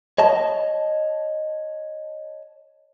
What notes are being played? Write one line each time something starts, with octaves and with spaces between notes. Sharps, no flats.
C#5 D#5 A5